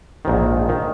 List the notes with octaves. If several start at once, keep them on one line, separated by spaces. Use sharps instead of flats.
A#1 G#2 D#3
D#3